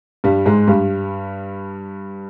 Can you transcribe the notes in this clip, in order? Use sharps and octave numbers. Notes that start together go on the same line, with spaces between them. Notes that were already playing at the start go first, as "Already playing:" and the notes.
G2 G3
G#2 G#3
G2 G3